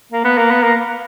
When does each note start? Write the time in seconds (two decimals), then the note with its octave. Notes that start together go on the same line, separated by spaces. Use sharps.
0.12 A#3
0.25 B3
0.38 A#3
0.51 B3
0.63 A#3